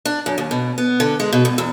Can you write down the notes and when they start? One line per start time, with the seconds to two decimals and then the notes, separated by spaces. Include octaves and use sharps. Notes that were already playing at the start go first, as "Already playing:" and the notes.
0.05 D4
0.26 F#2
0.38 D#2
0.51 B2
0.78 B3
1.00 D3
1.20 G#3
1.33 B2
1.45 G2
1.58 E2